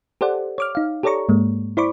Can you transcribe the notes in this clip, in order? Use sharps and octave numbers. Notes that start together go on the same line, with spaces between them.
G4 A4 C5 D5 F#5
C#5 D6 F6
D#4 F5
G4 A4 C#5 D5 A#5 C#6
G#2 G#3 A#3
E4 C5 D5 B5 C#6 D6